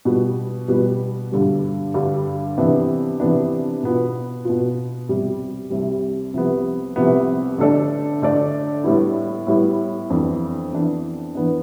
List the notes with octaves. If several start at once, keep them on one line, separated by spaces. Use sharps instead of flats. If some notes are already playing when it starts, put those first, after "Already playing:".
B2 G3 B3 F4 B4
B2 G3 B3 F4 B4
G2 D3 G3
G2 D3 G3
C3 E3 B3 D4
C3 E3 B3 D4
B2 B3 F4
B2 B3 F4
C2 C3 G3
C2 C3 G3
C2 C3 F3 B3
C2 C3 F3 B3
D3 A3 D4 A4 D5
D3 A3 D4 A4 D5
A2 G3 B3 E4
A2 G3 B3 E4
F2 E3 B3 D4
F2 E3 B3 D4
E3 B3 D4